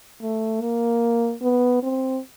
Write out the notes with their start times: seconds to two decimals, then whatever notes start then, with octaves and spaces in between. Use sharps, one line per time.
0.22 A3
0.61 A#3
1.42 B3
1.83 C4